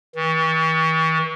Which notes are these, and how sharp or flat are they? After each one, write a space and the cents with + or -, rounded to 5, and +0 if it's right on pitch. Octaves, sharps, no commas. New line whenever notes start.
E3 -45